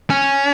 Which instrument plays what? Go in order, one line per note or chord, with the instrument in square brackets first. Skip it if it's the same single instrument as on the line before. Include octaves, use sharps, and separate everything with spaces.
[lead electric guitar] C#4